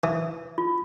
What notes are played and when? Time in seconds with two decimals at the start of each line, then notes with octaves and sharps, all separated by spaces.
0.04 E3
0.58 F4